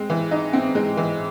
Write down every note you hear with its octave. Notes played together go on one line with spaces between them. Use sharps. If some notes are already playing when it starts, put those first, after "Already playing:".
Already playing: G#3 C4
E3
D#4
C4
G#3
E3